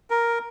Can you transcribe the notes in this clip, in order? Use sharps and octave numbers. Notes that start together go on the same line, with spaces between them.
A#4